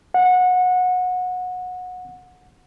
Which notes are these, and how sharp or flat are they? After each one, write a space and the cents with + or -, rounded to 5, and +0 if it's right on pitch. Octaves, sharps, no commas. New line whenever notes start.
F#5 -25